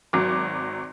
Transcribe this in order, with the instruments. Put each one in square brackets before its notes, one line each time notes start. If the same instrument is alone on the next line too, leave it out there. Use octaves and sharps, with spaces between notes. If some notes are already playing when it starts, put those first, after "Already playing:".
[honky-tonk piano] G#1 F#3 D6